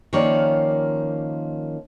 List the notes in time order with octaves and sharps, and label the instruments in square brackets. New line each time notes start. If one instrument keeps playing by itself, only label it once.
[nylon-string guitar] D#3 F3 A#3 C#4 C#5 D5